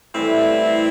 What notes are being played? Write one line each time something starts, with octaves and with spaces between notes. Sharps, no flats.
A2 E3 G3 C4 E4